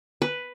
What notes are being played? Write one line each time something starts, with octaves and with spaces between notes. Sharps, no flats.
B4